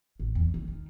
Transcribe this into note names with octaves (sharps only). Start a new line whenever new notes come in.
A1
E2
D#3
D#3